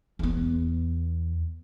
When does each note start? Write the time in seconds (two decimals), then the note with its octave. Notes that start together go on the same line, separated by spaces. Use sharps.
0.19 E2 B3